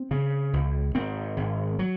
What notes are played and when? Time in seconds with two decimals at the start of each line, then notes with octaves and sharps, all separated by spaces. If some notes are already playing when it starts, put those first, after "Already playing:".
Already playing: C4
0.11 C#3
0.53 C#2
0.95 G#1 C4
1.37 G#1
1.79 F#3